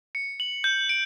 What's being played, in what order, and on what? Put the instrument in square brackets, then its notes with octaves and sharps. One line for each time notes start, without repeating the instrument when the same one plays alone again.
[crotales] C#7
F#7
G6
D7